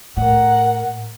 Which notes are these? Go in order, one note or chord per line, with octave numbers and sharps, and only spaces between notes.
A2 A#4 F#5